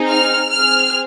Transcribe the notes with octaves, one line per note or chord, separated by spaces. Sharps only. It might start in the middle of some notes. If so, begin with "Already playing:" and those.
Already playing: C4 D#4 G#4
F6
C4 G#4 F6